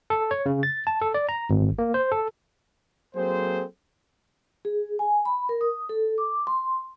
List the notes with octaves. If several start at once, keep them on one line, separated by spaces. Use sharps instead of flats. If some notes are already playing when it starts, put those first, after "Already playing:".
A4
C#5
C#3
A6
A5
A4
D5
A#5
G#1
A#3
C5
A4
F#3 A#3 C4 G#4 A4 C5
G#4
G#5
B5
A#4
D#6
A4
D6
C6